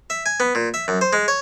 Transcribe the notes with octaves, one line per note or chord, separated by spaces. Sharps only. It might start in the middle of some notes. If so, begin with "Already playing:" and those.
E5
G#5
B3
A#2
E5
F#2
C5
G#3
C#5